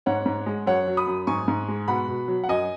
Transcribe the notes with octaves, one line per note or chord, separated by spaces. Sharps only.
G#2 C#5 F#5
G#2
G#3
F#2 C#5 F#5
F#3
B5 D#6
F#2
G#2 G#5 C#6
G#2
G#3
B2 F#5 B5
B2
F#3
F#5
F#2 D#5 G#5